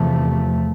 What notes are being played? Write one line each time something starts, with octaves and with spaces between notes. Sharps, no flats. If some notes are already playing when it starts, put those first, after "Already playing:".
Already playing: E2 C3 F3 A3